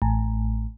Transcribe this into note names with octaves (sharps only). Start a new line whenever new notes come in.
A1